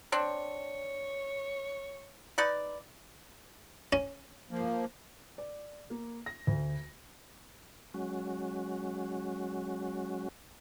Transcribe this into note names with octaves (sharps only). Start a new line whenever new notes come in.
C4 D4 C#5
D#4 B4 D5
C#4
F3 A#3
D5
A#3
A#6
D2
F#3 G#3 C#4 F#4